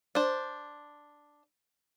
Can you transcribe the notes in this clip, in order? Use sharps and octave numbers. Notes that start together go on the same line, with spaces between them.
D4 C5